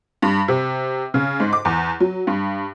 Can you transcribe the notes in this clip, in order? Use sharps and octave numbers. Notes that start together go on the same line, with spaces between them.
G2
C3
C#3
G#2
D6
E2
F#3
G2